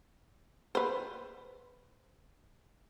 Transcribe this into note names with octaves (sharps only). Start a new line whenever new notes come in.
B4 C5